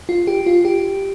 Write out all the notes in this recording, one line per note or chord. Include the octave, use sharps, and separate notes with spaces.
F4
G4
F4
G4